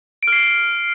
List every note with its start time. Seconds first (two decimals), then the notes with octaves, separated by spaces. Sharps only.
0.23 D7
0.28 F6
0.32 C7